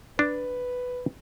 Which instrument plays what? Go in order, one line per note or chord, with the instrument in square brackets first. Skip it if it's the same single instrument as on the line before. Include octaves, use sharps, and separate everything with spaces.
[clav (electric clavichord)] D4 [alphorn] B4